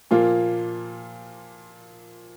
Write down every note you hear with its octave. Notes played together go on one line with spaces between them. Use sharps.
A#2 F3 A#3 F4